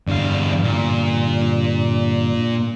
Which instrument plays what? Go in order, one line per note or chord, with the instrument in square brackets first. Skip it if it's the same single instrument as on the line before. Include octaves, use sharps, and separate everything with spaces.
[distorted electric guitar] E2 F5 [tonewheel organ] G2 D3
[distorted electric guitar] A#2